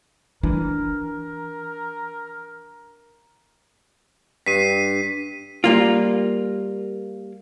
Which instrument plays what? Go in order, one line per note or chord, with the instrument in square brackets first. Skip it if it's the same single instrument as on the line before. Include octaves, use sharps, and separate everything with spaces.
[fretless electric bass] E3 [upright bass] D4 [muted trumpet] A#4
[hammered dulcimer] G2 [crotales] B6 C7 D#7
[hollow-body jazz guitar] G3 A#3 F4